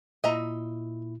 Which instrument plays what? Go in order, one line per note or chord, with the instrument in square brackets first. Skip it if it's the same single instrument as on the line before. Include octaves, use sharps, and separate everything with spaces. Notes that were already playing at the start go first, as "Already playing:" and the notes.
[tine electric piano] A#2 E4 [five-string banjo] D#5 E5 A#5